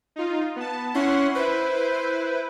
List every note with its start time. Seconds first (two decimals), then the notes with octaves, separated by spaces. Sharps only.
0.16 D#4 F4
0.56 B3 A5
0.95 C#4 E4 F#5 C6
1.35 E4 B4 C5